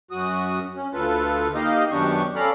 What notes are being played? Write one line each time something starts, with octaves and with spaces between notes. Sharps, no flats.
F#2 F#4 D#6
C#4
D2 F4 A4 B4
A#3 D#4 G4 D#5 F5
F#2 D#3 B3 D4 G4 C#6
C#4 A4 D5 F5 A#5 B5